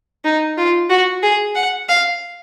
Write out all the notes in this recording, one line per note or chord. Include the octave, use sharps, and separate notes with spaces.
D#4
F4
F#4
G#4
F#5
F5